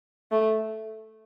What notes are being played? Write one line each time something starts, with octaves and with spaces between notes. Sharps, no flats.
A3